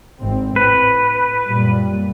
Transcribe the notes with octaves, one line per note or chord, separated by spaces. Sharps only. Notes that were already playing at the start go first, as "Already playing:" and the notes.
G#1 C4
A2 B4
F#2 A#2 G3